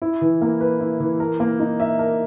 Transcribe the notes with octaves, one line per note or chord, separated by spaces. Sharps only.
E4
E3
A#3
B4
E4
E3
A#4
A#3
D#4
E5
A#4